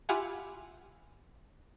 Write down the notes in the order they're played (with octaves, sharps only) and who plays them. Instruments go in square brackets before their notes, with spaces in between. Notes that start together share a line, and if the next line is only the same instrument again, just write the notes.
[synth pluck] E4 F4 G4 F5 F#5 G#5